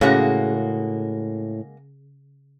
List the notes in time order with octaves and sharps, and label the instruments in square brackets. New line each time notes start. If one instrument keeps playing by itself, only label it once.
[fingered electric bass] A2 [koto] C#3 [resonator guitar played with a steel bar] G#3 A#3 F#4